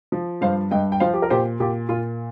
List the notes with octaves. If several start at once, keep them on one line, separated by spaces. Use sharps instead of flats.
F3
G2 C5 F5
G2 D#5 G5
G5
F3 C5 F5
G4
A#4
A#2 G4 C5
A#2 G4
A#2 F4